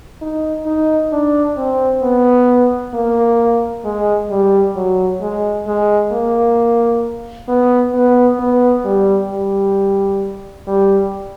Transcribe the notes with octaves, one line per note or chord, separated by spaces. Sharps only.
D#4
D#4
D4
C4
B3
A#3
G#3
G3
F#3
G#3
G#3
A#3
B3
B3
B3
G3
G3
G3